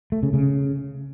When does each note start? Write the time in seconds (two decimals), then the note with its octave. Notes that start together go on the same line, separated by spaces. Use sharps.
0.12 A3
0.23 C#3
0.33 C#3